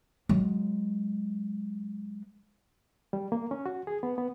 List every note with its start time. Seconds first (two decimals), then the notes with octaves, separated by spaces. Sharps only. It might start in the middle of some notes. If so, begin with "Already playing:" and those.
0.29 F#3 G#3
3.13 G3
3.32 A#3
3.51 C#4
3.66 F#4
3.87 G#4
4.03 B3
4.18 B3